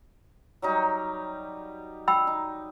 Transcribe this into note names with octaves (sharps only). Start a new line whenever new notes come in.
F#3 G3 D#4
G5 B5 E6
D#4